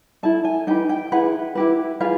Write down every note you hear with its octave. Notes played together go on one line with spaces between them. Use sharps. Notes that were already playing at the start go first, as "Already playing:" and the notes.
E4 A4 A5
G#5
D#4 G4 B4 G5
G5
E4 G#4 B4 F#5
E4 G4 B4
F4 G#4 B4 F5